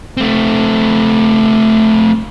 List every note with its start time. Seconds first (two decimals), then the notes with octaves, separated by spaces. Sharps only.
0.17 A3 C4